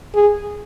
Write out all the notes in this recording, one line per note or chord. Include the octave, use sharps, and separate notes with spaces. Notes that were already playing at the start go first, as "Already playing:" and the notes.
G#4